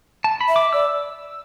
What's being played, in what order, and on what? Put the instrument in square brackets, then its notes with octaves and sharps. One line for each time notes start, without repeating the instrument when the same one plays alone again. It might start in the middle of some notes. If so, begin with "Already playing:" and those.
[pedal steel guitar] A5
B5
[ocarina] E5
[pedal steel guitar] D6
[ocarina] D5 [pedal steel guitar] E6